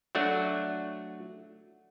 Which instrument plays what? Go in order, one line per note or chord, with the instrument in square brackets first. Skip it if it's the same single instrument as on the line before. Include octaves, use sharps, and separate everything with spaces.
[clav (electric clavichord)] F#3 A3 D4 F#4